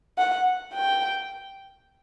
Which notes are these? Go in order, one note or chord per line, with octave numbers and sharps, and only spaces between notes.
F#5
G5